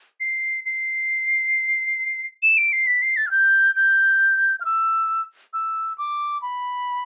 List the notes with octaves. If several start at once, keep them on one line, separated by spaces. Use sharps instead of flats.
C7
C7
E7
D7
C7
B6
C7
A6
F6
G6
G6
F6
E6
E6
D6
B5